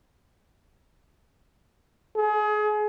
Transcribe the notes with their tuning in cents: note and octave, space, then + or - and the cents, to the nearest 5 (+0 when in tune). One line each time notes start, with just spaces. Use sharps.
G#4 +30